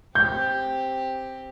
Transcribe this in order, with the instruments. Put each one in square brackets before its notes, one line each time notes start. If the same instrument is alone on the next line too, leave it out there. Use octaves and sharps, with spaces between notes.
[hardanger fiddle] C4 G4 [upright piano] G6